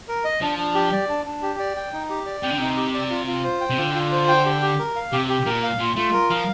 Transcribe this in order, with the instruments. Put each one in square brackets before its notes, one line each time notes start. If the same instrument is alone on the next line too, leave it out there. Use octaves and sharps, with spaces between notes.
[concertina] A#4
D#5
[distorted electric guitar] F3 [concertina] D4
[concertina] D4
G4
D5
D4
D4
G4
D5
G5
D#4
G4
D5
[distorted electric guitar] C3 [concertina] G5
[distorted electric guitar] D3
[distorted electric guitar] C3 [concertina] D#4
[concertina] G4
D5
F4
F4
C5
G5
[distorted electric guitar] C3
[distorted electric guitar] D3 [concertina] F4
[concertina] F4
C5
G5
G4
G4
A#4
F5
[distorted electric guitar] C3 [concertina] G4
[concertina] G4
[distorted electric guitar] A#2 [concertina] A#4
[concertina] F5
[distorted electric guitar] A#2 [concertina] F4
[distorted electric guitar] A3 [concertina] F4
[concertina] A#4
[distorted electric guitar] F3 [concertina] F5